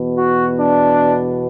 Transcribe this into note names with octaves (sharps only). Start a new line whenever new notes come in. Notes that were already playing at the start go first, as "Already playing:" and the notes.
Already playing: E2 B2
F#4
D4